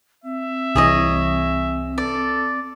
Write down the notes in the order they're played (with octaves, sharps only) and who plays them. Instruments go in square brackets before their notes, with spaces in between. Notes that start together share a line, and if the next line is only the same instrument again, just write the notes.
[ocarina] C4 [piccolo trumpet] E5
[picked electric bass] C2 E3 [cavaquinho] G#4 C#5 D#5
[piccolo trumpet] A4 [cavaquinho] D5